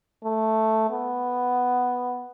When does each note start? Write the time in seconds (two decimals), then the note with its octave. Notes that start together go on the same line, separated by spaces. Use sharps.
0.24 A3
0.91 B3